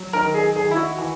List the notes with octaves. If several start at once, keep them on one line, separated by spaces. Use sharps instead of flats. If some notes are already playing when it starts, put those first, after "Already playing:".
Already playing: F#3
D#3 A#4
G#4
D#3 G#4
E4
F#4
E3